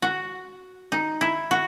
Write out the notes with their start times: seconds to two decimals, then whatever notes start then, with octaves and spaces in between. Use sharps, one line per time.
0.02 F#4
0.92 D#4
1.21 E4
1.51 F#4